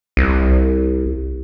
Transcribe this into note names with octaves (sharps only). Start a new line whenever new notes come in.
C2